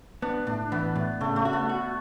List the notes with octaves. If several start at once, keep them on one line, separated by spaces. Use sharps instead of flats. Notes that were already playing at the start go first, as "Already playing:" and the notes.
B3 D4
A2 D4
E3 B3
A2
C#3 A3
A3
F#4
B3
F#4